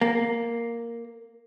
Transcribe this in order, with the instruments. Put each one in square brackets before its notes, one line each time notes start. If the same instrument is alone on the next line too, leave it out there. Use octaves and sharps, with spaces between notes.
[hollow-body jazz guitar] A#3